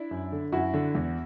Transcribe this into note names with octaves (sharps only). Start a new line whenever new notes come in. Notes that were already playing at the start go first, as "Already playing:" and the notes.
Already playing: D4 E4
F#2
D3
F#2 E4 F#4
D3
E2